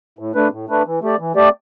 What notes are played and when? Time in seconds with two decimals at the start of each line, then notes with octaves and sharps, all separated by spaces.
0.19 A2
0.35 A3 D4 B4
0.52 A2
0.69 A3 D4 B4
0.86 E3
1.02 A3 G4 D5
1.19 E3
1.35 A3 G4 D5